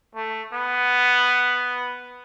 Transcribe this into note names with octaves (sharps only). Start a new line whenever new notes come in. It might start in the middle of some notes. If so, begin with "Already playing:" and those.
A3
B3